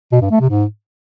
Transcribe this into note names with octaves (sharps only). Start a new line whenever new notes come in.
B2
G2
A3
C3
G#2